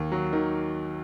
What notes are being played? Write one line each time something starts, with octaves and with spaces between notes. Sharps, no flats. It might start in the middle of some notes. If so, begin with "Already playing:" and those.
Already playing: D#2
F#3
D#3